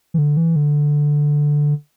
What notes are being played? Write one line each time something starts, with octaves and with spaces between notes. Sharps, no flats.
E3
D3
E3
D3